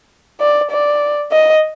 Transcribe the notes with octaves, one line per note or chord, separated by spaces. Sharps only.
D5
D5
D#5